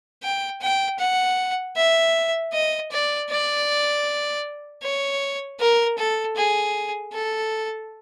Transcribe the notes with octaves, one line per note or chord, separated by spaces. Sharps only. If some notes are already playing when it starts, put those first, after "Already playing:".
G5
G5
F#5
E5
D#5
D5
D5
C#5
A#4
A4
G#4
A4